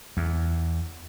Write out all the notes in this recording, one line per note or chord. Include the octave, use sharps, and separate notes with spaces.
E2